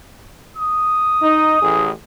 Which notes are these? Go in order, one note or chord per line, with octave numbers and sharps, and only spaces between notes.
D#6
D#4
A1 G#4